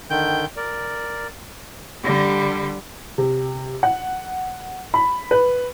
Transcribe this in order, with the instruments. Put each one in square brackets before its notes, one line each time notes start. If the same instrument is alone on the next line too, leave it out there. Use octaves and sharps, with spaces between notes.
[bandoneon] D3 D#3 G5 G6
A#4 D5
[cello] D3 G3
[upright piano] C3
F#5
B5
B4